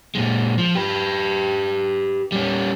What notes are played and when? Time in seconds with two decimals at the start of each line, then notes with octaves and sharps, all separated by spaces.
0.15 A#2 G#3
0.58 F3
0.75 G4 B4
2.32 G3 C#4